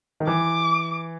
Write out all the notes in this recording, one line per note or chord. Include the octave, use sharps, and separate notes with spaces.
D#3
E3 D6